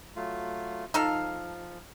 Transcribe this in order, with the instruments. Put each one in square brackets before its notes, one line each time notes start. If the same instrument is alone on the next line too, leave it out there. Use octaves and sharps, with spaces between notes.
[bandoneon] F#3 A3 F4
[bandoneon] F3 [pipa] D#4 A4 F5